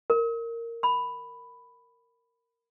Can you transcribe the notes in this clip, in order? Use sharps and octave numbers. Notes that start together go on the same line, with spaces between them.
A#4
B5